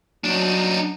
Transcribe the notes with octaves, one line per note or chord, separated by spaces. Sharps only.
F#3 D4 D#4